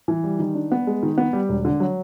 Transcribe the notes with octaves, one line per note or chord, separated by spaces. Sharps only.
E3
G3
D#3
D4
B3
G#3
D#3
B3
G3
E1
D3
F#3